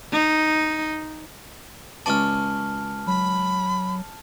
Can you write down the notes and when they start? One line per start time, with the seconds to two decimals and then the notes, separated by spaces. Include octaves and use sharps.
0.12 D#4
2.06 C#2 C#4 D5 A5 F6
3.07 F#3 B5